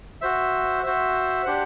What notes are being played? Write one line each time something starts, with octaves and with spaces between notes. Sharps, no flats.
F#4 C5 E5
F#4 C5 E5
D4 G4 C5 F#5